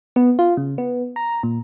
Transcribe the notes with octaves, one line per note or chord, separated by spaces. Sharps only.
B3
F4
C#3
B3
A#5
A#2